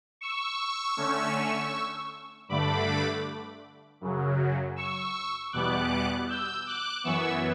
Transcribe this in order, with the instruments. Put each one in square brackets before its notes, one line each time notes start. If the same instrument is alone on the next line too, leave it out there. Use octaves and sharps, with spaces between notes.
[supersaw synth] C#6 E6
D3 A3 C#4
G2 D3 A3 D4 B5 D6
F#2 C#3 F#3
C#6 E6
E2 B2 G3 B3 D6 F#6
E6 G6
D6 F#6
F#2 E3 B3 C#6 E6